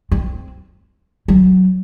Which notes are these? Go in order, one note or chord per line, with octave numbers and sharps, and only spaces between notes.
C4
F#3